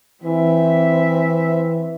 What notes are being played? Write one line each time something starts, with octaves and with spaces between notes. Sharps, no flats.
E3 C4 E5